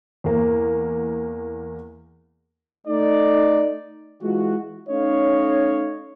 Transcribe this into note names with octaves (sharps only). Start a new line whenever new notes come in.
E2 A#3
A3 D#4 D5
E3 G#3 F4 F#4
A3 C#4 D#4 C#5 D#5 F5